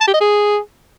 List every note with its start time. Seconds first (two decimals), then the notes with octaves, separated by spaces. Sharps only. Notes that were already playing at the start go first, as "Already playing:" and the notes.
0.01 A5
0.07 G4
0.14 D#5
0.21 G#4